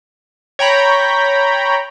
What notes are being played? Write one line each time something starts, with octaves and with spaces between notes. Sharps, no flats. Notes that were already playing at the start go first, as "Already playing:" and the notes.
C#5 G5 A#5 B5